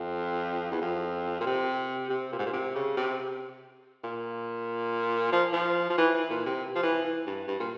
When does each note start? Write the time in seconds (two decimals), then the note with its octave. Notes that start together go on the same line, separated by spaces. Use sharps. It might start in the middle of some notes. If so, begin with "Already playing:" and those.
Already playing: F2
0.72 E2
0.81 F2
1.41 A#2
1.46 C3
2.10 C3
2.32 A#2
2.39 G#2
2.46 A#2
2.53 C3
2.75 C#3
2.97 C3
4.04 A#2
5.33 F3
5.53 F3
5.90 F3
5.98 E3
6.14 E3
6.30 A#2
6.46 C3
6.75 F3
6.83 E3
7.05 E3
7.27 G2
7.48 G2
7.60 A#2